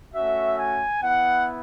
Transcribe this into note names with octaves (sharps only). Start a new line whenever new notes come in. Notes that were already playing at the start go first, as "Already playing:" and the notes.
A3 C#4 F#4 E5
G#5
B3 E4 F#5